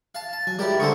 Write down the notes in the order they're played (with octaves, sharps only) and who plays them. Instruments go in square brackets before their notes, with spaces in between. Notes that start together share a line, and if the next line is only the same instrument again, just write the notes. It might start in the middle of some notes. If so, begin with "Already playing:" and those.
[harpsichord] F5 A5
A5
[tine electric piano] F#3 [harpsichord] G#5
[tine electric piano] G3 G#3 A#4 [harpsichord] E4 G4 D5
[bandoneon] D3 [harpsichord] G#4 A#4 C5 [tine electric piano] C#6